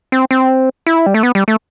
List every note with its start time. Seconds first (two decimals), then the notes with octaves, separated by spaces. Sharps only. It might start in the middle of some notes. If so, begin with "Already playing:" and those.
0.12 C4
0.31 C4
0.87 E4
1.07 G3
1.14 A3
1.23 B3
1.35 G3
1.48 A3